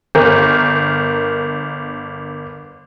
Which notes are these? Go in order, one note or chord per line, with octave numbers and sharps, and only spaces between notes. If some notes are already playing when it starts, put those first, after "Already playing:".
G1 A#4